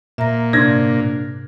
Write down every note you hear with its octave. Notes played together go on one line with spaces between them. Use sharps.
A#2 E5 A#5 A#6
G#2 C3 D4 G#6 A#6